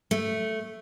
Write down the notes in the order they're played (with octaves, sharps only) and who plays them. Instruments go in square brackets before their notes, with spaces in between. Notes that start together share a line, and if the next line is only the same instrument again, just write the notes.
[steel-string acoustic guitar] A3